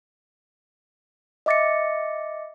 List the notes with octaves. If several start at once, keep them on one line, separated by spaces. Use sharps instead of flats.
D#5 E5 D6 A6 A#6 C#7